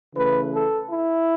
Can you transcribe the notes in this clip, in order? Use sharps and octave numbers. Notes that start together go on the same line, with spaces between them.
C#3 E3 A3 B4
A4
E4